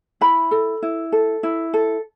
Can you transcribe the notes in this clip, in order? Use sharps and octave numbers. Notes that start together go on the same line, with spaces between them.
E4 B5
A4
E4
A4
E4
A4